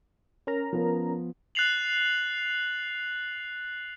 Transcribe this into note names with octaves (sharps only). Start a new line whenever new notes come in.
C#4 A#4 A#5
F3 B3
F#6 A6 C7 F7 F#7